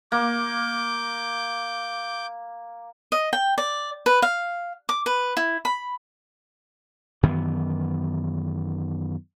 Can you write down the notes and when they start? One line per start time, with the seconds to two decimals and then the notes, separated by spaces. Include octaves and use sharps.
0.12 A#3 D6 G6
3.12 D#5
3.33 G5
3.58 D5
4.06 B4
4.22 F5
4.89 D6
5.06 B4
5.37 E4
5.65 B5
7.23 F#2 D#3 E3 B3